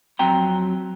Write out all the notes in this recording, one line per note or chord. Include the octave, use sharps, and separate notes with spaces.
F2 F#3 C4 G5 A#5